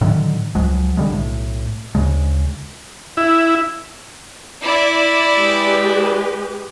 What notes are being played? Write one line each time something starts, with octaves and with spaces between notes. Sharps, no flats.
A2 D3 D#3 F#3
C#2 F3 F#3 G#3
D3 G3 G#3
B1 A2
D2 C#3 G#3
E4
E4 D5
G#3 G4 B4